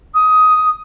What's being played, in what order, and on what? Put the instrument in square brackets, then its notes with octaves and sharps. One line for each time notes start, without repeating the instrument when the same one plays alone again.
[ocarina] D#6